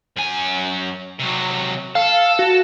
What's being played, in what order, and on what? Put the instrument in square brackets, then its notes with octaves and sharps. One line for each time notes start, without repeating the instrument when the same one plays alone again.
[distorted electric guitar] F#2 G#5
C3 F#3
[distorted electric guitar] A4 [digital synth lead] F5
[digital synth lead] F#4